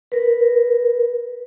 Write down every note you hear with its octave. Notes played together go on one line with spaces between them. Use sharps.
A#4 B4